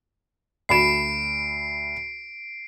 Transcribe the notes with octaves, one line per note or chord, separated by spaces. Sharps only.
D2 B5 C7 D7 E7